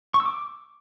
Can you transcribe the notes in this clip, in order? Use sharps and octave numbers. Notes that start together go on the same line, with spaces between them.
C#6
E6
D6